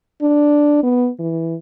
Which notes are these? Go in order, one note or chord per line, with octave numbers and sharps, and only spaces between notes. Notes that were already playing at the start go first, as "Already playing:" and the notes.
D4
B3
E3